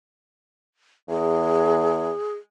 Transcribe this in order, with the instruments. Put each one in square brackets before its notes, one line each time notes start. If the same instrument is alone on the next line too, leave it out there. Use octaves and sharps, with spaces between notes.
[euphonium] E2 [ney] G#4